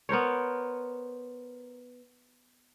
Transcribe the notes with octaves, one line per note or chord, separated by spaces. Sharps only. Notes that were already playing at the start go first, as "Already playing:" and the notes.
B3 A#4 C5 C#5